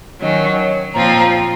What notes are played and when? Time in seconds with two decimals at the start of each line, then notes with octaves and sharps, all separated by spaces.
0.21 D#3 F#3 C#4 D#5
0.57 C#5
0.94 A#2 F3 C4 F4 A#5
1.19 A#5